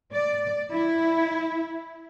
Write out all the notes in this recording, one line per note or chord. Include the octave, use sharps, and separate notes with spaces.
D5
E4